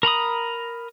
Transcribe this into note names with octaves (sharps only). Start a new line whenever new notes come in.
A#4 A#5 B5 D#6